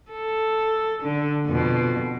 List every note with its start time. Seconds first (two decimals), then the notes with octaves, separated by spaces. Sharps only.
0.11 A4
1.03 D3
1.47 F2 B2